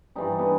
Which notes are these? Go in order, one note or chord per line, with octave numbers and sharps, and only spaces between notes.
G2 E3 G3 D#4
B3